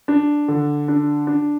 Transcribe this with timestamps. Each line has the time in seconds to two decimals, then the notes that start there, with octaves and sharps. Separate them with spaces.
0.08 D4
0.48 D3
0.88 D4
1.27 D4